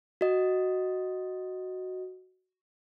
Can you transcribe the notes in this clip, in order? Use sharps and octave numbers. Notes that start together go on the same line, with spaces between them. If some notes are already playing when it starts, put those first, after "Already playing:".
F#4 D#5